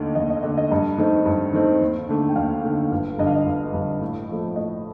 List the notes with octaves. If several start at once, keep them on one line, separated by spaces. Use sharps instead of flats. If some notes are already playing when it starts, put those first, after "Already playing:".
Already playing: D#2 D3 A3 D#5
D#2 D#5
D#5
D3 A3 D#5
D#5
G2 D#5
D#3 A3 C4 D#4
G2
D#3 A3 C4 D#4
D#2
D3 A3
G5
D#2 F5
D3 A3
G1 F5
G2 D3 D#5
F5
D#5
G1
G2 D3
A2
F3 A3
A2 D#5